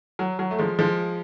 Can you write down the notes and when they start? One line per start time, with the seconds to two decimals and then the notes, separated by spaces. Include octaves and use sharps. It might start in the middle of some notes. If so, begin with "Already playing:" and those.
0.19 F#3
0.39 F#3
0.51 A3
0.59 F3 G#3
0.79 F3 G#3